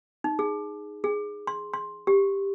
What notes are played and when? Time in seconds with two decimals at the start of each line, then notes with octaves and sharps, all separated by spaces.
0.24 D#4
0.39 G#4
1.04 G#4
1.47 C6
1.73 C6
2.07 G4